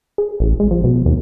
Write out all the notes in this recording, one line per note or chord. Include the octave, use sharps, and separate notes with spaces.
G#4
A1
G#3
F3
B2
D#2